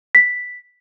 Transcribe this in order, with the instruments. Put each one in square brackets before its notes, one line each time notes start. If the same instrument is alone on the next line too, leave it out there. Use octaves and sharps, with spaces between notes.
[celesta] B6